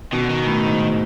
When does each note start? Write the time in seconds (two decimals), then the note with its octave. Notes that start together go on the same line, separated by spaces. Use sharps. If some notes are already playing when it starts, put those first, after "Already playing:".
0.13 B2 D#3
0.21 D3
0.30 D#3
0.47 A2
0.65 G#2